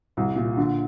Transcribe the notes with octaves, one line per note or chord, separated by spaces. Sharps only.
C2
A#2
D3